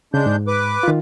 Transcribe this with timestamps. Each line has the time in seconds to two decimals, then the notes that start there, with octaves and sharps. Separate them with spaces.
0.14 C#3 G#3 D4 G6
0.26 G#2
0.48 B4 D6
0.83 D#3 F4